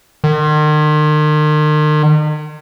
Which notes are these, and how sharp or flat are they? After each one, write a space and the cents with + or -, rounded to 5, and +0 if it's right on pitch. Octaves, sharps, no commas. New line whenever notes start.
D#3 -40